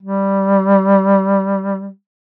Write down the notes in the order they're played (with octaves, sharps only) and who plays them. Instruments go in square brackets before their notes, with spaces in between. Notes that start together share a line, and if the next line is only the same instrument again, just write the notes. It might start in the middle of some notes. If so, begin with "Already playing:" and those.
[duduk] G3